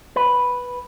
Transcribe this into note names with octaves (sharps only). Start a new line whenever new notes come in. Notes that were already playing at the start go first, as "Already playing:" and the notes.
B4